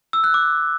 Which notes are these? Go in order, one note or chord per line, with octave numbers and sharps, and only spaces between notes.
E6
F#6
D6